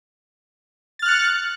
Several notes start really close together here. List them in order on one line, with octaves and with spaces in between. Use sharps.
A6 F6 F#6 C#7